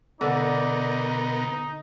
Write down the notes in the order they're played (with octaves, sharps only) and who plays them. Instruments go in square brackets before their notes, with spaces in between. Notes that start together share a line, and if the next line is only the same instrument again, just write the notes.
[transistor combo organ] B2 B3 A#4 [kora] D3 [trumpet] D#4 [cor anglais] D5